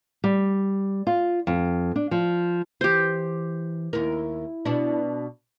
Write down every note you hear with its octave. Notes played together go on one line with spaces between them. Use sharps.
G3
F4
F2
D4
F3
E3 G4 C5
D#2 E4 A#4
B2 D4